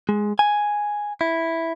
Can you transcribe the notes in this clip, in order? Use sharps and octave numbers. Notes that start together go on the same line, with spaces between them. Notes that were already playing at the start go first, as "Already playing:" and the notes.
G#3
G#5
E4